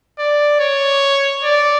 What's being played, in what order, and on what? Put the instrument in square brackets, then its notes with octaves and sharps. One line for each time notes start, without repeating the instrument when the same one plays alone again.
[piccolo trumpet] D5
C#5
D5